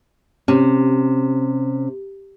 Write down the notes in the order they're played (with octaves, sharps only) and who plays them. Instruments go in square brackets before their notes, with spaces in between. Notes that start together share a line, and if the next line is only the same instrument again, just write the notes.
[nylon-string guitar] C3 [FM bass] C#4